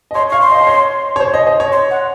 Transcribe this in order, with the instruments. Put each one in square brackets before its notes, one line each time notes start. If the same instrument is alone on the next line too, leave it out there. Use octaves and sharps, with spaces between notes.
[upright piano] D#5
[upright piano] C#5 [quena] C6
[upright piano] F5 [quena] C#6
[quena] C6
[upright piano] D#5
D#5
C#5
C#5
C5
D#5
D#5
C#5
[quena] C6
F#5